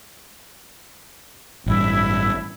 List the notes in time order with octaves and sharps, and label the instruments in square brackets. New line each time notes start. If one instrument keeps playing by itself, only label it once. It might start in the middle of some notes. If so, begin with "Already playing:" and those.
[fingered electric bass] A1 G2 [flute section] E4